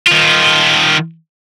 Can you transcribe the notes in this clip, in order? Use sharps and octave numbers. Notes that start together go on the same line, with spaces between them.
D#3 F4